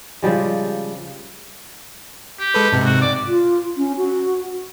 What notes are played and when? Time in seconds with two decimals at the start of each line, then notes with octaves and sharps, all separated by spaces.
0.23 C#3 F3 G3 G#3
2.39 G4
2.54 G#3 A4 B4
2.72 G#2 C3
2.85 F#4
3.01 D5
3.28 F4
3.77 C#4
3.97 F#4